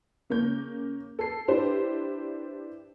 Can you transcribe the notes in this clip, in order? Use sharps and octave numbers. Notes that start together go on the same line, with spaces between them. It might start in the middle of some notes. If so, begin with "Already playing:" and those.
C#3 A#3 C#4 G6
A4 C7
D4 E4 G4 B4 C5